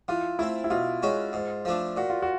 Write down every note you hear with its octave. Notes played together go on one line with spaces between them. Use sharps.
E3 F4
A3 C4 E4
E4
B2 F4
G#3 C#4 F#4
G#2
F3 A3 D4
A#2 F#4
F4
F#4